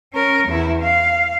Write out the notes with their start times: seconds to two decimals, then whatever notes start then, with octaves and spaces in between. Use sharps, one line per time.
0.13 C#4 A#4
0.47 E2 E4
0.82 F5